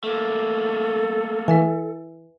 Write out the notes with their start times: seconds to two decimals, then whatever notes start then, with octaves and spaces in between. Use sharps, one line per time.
0.04 A3 A#3 A4
1.48 E3 B4 E5 G#5